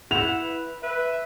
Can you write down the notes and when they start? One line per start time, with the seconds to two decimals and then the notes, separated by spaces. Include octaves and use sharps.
0.11 E4 F#5 F7
0.43 B4
0.83 B4 E5